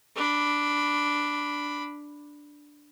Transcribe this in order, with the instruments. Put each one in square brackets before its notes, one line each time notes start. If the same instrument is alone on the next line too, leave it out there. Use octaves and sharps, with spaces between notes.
[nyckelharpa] D4 B5